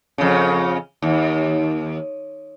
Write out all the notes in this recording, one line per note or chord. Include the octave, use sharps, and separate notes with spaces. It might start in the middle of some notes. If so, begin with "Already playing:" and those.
F2 C#3
D#2